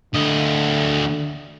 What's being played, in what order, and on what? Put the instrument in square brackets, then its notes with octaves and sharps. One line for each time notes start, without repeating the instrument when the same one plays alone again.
[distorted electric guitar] D2 D#5 [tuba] D3